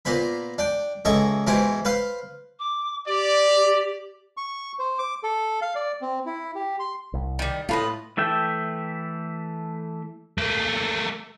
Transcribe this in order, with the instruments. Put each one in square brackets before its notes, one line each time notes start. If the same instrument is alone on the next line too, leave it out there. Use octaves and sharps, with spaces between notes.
[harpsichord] A#2 B3 C5 B5
D4 G5
C#2 E3 A4 D#5 C#6
G#2 B2 E3 G4 C5
B4 C5 F5
[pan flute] D6
[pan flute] G4 [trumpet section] D5
[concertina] C#6
C5
D6
A4
F5
D5
C4
E4
G4
C6
[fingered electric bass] C2
[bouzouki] D#3 G3
[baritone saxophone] A2 [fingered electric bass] A3 [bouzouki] F4 B4 D#5
[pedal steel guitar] E3 A3 E5 G5
[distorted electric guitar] A3 A#3